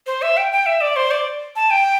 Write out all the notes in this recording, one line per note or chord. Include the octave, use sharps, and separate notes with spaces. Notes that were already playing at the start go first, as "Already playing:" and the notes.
C5
E5
G5
G5
E5
D5
C5
D5
A5
G5